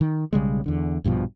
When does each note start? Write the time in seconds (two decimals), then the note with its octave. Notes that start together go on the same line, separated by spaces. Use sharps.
0.01 D#3
0.33 B1 C#3 G3 G#3
0.66 E2 D3
1.04 A#1 G2 B2 F3